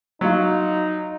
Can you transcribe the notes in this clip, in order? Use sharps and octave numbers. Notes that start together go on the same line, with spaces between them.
F#3 D#4 F4